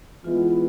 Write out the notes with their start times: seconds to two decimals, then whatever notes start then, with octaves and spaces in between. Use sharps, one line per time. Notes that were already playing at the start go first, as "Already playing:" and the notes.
0.24 E3 G#3 B3 F4